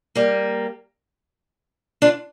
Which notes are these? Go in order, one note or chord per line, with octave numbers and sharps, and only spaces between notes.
G3 A#3
D4 F4